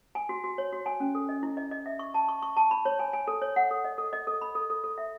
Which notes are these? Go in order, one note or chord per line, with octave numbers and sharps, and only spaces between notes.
G#5
F#4
F#4
C#5
F#4
G#5
C#4
A4
D#5
E4
D#5
D#5
E5
C#6
A5
C#6
C#6
A5
B5
C#5
G#5
G#5
A4
C#5
F#5
A4
D#5
A4
D#5
A4
B5
A4
A4
A4
E5